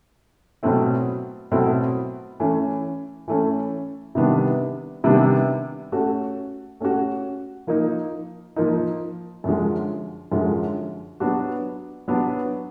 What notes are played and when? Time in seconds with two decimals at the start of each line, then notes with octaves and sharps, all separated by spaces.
0.63 B2 F#3 A3 C4 E4
1.51 B2 F#3 A3 C4 E4
2.40 E3 A3 C#4
3.28 E3 A3 C#4
4.15 C3 D#3 G3 B3 D4
5.04 C3 D#3 G3 B3 D4
5.92 A3 C#4 F#4
6.80 A3 C#4 F#4
7.67 F3 A#3 D#4
8.56 F3 A#3 D#4
9.44 F#2 D3 F3 G#3
10.32 F#2 D3 F3 G#3
11.20 F#3 B3 D4 F#4
12.08 F#3 B3 D4 F#4